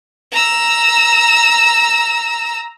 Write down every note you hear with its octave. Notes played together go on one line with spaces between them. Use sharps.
A#5 E6